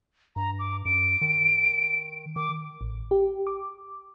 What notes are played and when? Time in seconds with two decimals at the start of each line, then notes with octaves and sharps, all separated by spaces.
0.36 G2 A#5
0.59 D6
0.85 F#2 D7
1.21 D#3
2.36 D#3 D6
2.81 A1
3.11 G4
3.47 D6